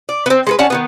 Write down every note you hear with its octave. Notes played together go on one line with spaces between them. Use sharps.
D5
B3 C4
G#3 A4 B4
C#4 D5 F#5 A5
D#3 E3 B3